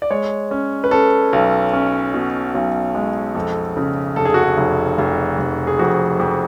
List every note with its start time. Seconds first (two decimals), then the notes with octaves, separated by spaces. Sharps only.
0.02 D5
0.10 G#3 C#5
0.51 C#4
0.84 B4
0.91 C#4 A4
1.33 B1
1.73 C#4
2.14 B2
2.54 B1
2.95 G#3
3.35 F2 A4
3.77 C#3
4.16 F1 A4
4.25 G#4
4.34 F#4
4.43 G#4
4.57 F1
4.98 F1
5.39 F1
5.67 G#4
5.79 F2 F#4
6.20 F2